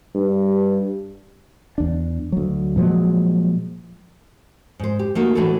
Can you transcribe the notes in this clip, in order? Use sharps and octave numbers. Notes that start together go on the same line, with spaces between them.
G2
E2 D4
D2 F#3
A#2 F3 F#3 G#3
G#2 C5
G4
A3 A#3 D#4 F#4
A2 E3 D4 D#4 F#4 A4